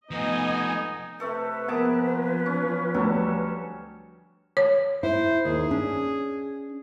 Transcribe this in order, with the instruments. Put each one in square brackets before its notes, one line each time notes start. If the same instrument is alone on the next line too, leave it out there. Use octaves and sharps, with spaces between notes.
[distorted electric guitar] F3 A3 [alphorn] B3 [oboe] D#4 [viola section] D#5 G#5
[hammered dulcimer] C3 A3 A4 [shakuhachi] B4
[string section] F3 [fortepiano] A#3 B3 [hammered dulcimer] G#4 A5 D6
[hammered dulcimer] C#4
[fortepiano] D2 F#3 G3 [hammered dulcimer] A4
[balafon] C#5
[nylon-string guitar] E4 [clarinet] C5
[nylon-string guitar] D#2 [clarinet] G#4
[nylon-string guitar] C#4 D4